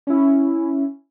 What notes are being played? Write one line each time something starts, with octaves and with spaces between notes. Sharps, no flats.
C#4 E4